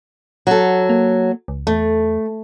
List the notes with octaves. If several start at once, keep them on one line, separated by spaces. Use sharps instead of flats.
F#3 A4
A#3
C#2
E2 A3